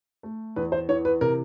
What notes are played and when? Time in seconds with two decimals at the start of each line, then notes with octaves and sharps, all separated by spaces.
0.23 A3
0.56 E2 B4
0.72 C5
0.89 E3 C#5
1.05 B4
1.21 C3 A#4